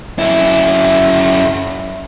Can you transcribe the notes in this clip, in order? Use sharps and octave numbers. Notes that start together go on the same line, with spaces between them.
F#2 E4